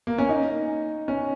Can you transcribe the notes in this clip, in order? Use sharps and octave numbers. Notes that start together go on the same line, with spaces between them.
A#3
C#4
D#4
C#4